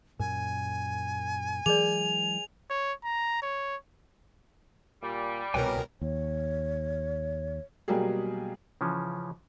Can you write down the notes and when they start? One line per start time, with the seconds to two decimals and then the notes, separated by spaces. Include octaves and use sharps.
0.20 F#2 A#2 A#4 G#5
1.66 E3 F#3 G#3 G#4 A#4 D5 F7
2.70 C#5
3.04 A#5
3.42 C#5
5.02 A#2 G3
5.54 C2 B2 A#4 B4 C#5 G5 G#5
6.01 D#2 C#5
7.88 B2 F#3 G3 A#3 G4 G#4
8.81 C#3 E3 F3 C#4